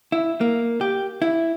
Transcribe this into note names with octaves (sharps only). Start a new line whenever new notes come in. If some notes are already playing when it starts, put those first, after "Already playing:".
E4
A#3
G4
E4